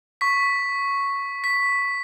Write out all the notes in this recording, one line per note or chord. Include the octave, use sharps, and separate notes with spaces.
C#6 B6
B6